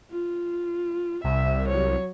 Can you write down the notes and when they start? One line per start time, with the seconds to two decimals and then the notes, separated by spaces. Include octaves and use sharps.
0.11 F4
1.24 C2 E5
1.69 F#3 C#5